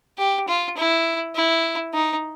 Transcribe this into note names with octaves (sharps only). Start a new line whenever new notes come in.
G4
F4
E4
E4
D#4